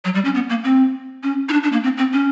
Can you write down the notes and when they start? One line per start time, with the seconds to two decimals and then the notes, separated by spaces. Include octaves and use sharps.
0.05 F#3
0.15 G3
0.25 C#4
0.35 B3
0.50 A#3
0.64 C4
1.23 C#4
1.49 D#4
1.53 D4
1.63 D4
1.72 A#3
1.84 C4
1.98 C4
2.13 C#4